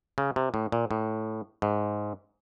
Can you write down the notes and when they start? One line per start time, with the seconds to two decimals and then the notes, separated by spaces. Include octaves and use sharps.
0.18 C#3
0.36 C3
0.54 A2
0.72 A#2
0.91 A2
1.62 G#2